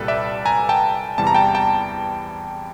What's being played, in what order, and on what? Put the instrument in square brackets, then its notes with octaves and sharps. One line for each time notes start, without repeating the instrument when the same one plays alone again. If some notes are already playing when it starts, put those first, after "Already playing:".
Already playing: [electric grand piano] C2 A#2 G3 A4 B4
D5 E5
G#5 A#5
G5 A5
E2 C3 E3 G3 A5
A#5
G5 A5
G5 A5